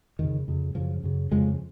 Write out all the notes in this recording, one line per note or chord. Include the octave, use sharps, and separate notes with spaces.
F2 D#3
C#3
F2 C#3
F#2 C#3 F3
F#2 C#3
F2 C#3 F3 G#3